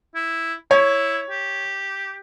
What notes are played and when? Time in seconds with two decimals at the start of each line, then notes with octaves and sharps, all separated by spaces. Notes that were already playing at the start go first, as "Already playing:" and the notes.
0.15 E4
0.71 E4 C#5
1.30 G4